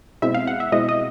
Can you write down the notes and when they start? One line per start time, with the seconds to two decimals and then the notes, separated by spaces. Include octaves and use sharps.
0.22 B2 G#3 C4 E4 E5
0.34 F5
0.47 F#5
0.60 E5
0.72 B2 G#3 C4 E4 D#5
0.89 D#5